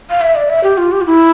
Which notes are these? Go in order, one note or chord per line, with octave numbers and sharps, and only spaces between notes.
F5
E5
D5
E5
G4
F4
G4
F4
E4